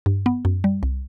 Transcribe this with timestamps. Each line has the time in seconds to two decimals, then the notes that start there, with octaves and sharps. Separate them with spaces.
0.06 G2
0.26 B3
0.45 F#2
0.64 G3
0.83 C2